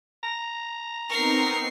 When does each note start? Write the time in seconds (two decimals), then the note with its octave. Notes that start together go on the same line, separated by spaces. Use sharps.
0.23 A#5
1.10 B3 C4 D#4 A#4 C#6 C7